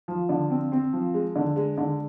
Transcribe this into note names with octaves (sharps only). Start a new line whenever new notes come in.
F3
D3
C4
C4
F3
G#3
D3
G#3
D3